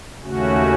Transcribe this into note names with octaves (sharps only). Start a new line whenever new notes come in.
D#2 C#3 A3 C#4 F#4